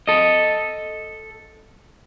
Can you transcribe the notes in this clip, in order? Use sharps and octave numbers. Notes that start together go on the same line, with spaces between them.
A4 D#5